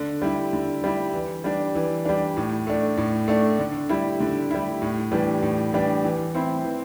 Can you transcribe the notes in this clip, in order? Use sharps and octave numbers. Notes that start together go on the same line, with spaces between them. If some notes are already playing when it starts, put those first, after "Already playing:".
Already playing: D3
G3 E4
D3
G3 E4
E3
G3 D4
E3
G3 D4
A2
A3 D4
A2
A3 D4
D3
G3 E4
D3
G3 E4
A2
E3 G3 D4
A2
E3 G3 D4
E3
C4 E4
E3